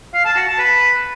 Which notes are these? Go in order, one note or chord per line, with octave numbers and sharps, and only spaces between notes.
F5
A5
F#4
A5
B4